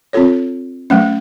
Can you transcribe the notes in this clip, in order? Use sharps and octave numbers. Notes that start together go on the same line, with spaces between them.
C4 F4 A4 C#5
F#3 A3 C#4